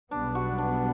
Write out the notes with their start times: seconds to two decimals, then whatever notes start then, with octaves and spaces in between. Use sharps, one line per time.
0.11 B1 B2 G3 B3 D4
0.35 F#4
0.58 D4